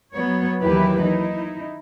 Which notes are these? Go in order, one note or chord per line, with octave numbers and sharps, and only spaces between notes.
F#3 B3 C#5
D#2 E3 F#3 E4 G4 B4
D#4 E4